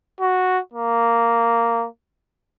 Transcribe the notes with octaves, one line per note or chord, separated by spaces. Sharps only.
F#4
A#3